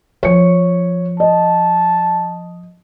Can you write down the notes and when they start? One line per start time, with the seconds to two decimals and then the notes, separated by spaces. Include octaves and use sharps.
0.23 F3 C#5 C#7
1.20 D#5 A5